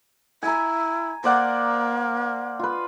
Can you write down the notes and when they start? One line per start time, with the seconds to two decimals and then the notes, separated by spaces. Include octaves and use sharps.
0.43 E4 G#5 A#5
1.24 A#3 C5 D5 F#5
2.59 F4 B4